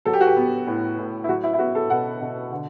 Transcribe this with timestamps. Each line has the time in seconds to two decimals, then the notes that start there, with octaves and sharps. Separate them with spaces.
0.05 F#3 A4
0.13 G4
0.21 F#4
0.27 G4
0.36 B3
0.67 A2
0.99 A2
1.24 E4
1.29 F#3 F#4
1.43 E4
1.54 E4
1.59 B3 F#4
1.75 A4
1.90 B2 F#5
2.21 B2
2.52 D3